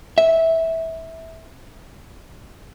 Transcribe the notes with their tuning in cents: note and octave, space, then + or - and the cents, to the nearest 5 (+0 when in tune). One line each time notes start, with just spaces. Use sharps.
E5 -15